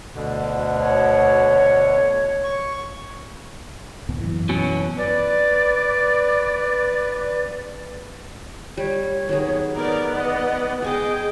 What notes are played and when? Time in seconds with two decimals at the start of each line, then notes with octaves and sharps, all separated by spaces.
0.15 D2 B2 D3
0.79 C#5
2.44 C#6
4.09 C#2 G#2 B3
4.21 F#2 E3
4.49 B2 F#3 C#4
4.97 B4 D5
8.77 G3 C#5
9.29 D#3 F#3 B3 G#4
9.76 B3 D#4 A#4 D5
10.15 D5 D#5 F#5
10.82 G#3 G#4 D#5 G5 C#6 D6